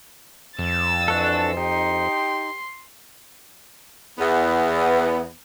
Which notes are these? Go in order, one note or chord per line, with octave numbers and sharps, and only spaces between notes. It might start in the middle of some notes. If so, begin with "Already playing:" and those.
F2 E6 A6
E3 D4 F#4 A4
D#4 G4 C6
E2 B3